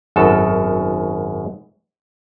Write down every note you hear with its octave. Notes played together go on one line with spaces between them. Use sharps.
G#1 F#2 B2 F#4 A4 A5